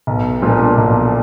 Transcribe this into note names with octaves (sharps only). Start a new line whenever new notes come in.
B1
A#2 F3 A#3 D4
B1